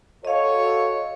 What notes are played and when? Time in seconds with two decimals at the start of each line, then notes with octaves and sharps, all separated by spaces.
0.25 F#4 A4 C#5 D#5 F5